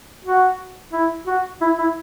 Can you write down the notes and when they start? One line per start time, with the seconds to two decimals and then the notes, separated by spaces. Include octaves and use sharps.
0.25 F#4
0.92 E4
1.26 F#4
1.61 E4
1.78 E4